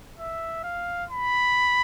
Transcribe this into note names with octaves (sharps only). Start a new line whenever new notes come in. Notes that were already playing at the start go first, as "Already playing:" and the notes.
E5
F5
B5